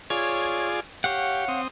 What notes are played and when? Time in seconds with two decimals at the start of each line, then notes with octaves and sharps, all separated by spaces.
0.10 F4 G#4 C#5 D5
1.04 G4 C#5 F5 F#5
1.48 C4 D#6